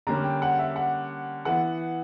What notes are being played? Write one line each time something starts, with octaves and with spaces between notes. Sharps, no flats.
D3 G3 A#3 C#4 A#5
G5
F#5
E5
F#5
E3 B3 F#5